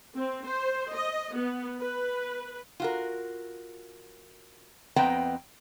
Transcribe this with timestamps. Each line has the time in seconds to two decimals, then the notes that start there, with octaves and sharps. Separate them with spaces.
0.15 C4
0.44 C5
0.94 D#5
1.36 B3
1.80 B4
2.80 F4 F#4 A#4
4.96 F2 B3 C4 D#5 G5 A#5